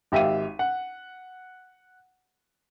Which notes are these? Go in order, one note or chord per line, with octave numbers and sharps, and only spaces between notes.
G#1 G4 E5 F5 D#7
F#5